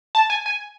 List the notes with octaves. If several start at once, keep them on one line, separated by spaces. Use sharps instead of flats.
A5
G#5
G#5